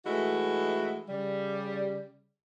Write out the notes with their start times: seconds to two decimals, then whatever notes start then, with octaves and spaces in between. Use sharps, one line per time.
0.05 E3 G#3 A3 D#4 E4 F#4
1.08 C#3 G3